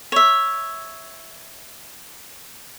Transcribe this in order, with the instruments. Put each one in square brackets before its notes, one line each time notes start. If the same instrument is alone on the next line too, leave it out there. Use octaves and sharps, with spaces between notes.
[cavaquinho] C#5 E5